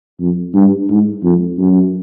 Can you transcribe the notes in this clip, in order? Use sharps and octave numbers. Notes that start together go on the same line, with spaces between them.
F2
G2
G#2
F2
F#2